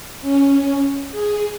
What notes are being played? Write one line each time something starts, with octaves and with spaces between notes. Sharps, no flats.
C#4
G#4